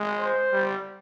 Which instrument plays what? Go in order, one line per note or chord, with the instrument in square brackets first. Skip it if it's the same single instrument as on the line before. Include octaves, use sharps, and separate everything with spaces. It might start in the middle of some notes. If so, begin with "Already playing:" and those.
Already playing: [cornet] G#3
[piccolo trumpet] C5
[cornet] G3